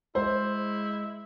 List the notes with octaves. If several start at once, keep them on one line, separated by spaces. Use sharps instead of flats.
G#3 E4 C5